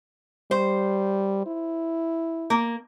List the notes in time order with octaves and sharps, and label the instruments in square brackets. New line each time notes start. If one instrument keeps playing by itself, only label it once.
[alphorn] G3 [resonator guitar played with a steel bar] C5
[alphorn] E4
[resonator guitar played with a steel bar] A#3